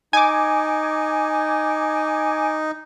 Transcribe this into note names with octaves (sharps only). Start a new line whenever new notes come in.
D#4 G#5 D6